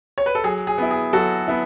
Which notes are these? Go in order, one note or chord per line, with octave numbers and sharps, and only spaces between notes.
C#5
B4
A4
F#3 G#4
G#4
B3 E4
G#4
F#3 F#4 A4
B3 E4